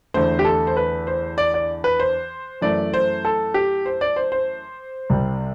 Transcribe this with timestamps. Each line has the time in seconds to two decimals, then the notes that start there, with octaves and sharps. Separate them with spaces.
0.14 E2 D3 A3 C5
0.39 G4
0.45 A4
0.67 C5
0.77 B4
1.07 C5
1.38 D5
1.54 D5
1.84 B4
2.00 C5
2.61 F#2 E3 A3 D5
2.94 C5
3.25 A4
3.54 G4
3.86 C5
4.01 D5
4.16 C5
4.32 C5
5.10 C2 C3 G3